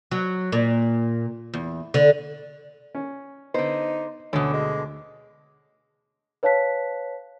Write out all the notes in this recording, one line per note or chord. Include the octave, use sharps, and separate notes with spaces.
F#3
A#2
E2
D3
C#4
D3 B3 D#4 C5
D2 B2 D3 C#4
G#3
B4 C#5 F5 A5 F#6 B6